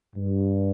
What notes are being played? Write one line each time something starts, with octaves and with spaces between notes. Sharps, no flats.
G2